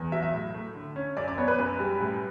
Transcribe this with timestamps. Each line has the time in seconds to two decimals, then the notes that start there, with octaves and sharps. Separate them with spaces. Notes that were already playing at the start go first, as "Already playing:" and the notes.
Already playing: E2
0.12 F#3 E5
0.23 E5
0.34 A2
0.54 A3
0.75 D3
0.96 C#4
1.17 F#2 D5
1.28 D5
1.38 B3 C#5
1.48 B4
1.59 F#2 B4
1.79 G3
2.00 A2